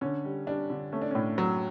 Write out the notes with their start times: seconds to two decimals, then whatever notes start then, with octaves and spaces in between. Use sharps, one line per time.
0.01 D3 C#4
0.25 G3
0.47 G3 D4
0.70 D3
0.92 A3 C#4
1.02 D4
1.11 A2 C#4
1.38 F#3